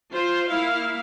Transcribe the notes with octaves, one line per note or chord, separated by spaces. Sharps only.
F4 C5
A#3 E4 F5